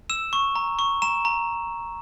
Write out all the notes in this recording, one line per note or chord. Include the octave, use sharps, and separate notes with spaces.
E6 E7
C#6
A#5
C#6
A#5 E7
A#5